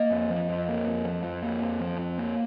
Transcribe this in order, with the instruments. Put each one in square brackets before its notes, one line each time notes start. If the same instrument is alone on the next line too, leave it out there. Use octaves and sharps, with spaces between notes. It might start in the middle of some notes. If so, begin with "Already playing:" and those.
Already playing: [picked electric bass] A#3 [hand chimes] D#5
[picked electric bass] F2
F3
F2
A#3
F2
F3
F2
A#3
F2
F3
F2
A#3